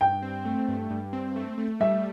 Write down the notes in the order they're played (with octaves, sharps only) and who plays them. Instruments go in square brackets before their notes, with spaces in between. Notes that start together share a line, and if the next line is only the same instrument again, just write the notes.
[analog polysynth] G2 [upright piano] G5
[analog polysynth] C4
A3
G2
G2
C4
A3
A3
[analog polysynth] G3 [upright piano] E5